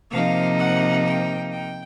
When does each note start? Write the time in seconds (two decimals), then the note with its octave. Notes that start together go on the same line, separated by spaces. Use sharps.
0.10 C3 F3 A#3 D#4 F5
0.57 F#5
1.05 G5
1.51 G5